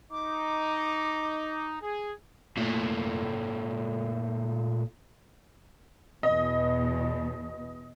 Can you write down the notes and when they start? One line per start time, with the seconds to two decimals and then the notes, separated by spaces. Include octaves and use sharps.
0.11 D#4 D6
1.82 G#4
2.57 A#2 A3
6.23 E2 B2 D#5